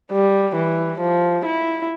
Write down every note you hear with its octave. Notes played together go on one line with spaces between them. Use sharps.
G3
E3
F3
E4